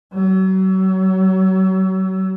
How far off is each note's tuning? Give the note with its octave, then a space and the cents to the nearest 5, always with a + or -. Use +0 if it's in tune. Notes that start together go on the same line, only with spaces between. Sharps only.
F#3 +35